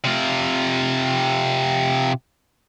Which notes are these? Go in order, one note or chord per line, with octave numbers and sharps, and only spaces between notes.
C3 F4